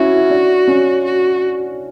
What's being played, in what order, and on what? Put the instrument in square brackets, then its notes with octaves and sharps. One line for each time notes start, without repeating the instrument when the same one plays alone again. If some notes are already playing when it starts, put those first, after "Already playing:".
Already playing: [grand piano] C#4 E4 [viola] F#4
[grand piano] D4
C#4
[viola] F#4